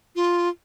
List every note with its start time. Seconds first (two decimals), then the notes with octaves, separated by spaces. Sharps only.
0.16 F4